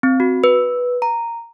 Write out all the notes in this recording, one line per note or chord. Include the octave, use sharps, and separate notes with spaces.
C4
F#4
B4
A#5